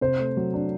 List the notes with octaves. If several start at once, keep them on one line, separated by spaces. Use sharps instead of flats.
C3 C5
A3
F#3
D4